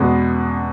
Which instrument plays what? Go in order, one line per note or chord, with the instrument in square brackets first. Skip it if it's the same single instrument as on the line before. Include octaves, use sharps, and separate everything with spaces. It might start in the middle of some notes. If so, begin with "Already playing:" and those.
Already playing: [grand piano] E2 B2 G#3 B3